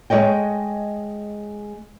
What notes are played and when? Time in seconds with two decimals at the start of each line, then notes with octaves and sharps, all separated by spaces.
0.10 G#3 C#5 D#5 G5